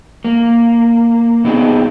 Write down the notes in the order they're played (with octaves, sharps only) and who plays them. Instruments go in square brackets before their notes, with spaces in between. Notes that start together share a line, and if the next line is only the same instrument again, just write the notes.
[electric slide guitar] A#3
B2 B3 C4 D#4 G#4